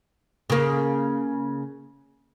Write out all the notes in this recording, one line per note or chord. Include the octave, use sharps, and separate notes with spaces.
C#3 A#3